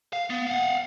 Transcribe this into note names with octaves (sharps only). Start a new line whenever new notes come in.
F5
B3
F5 F#5